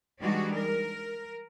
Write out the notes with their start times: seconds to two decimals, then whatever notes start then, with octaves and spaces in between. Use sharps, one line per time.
0.22 E3 G3 G#3 D4 D#4 F#4
0.55 A#4